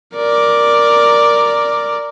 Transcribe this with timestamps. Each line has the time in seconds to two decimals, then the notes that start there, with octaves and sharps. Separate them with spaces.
0.16 A#4 D5